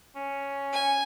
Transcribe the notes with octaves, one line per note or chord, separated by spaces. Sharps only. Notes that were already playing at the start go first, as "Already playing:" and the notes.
C#4
G#5